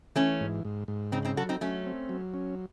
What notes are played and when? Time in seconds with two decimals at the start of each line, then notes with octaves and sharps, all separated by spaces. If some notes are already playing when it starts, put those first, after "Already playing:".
0.16 E3 A3 C#4
0.41 G#2
0.65 G#2
0.88 G#2
1.12 C#3 C4 D#4
1.25 C4 D#4
1.37 F#3 F#4 A4
1.49 C4 D#4
1.61 F#3 A3 C#4
1.86 C4
2.09 F#3
2.34 C#4